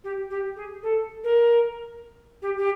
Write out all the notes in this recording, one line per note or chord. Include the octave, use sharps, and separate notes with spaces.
G4
G4
G#4
A4
A#4
G4
G4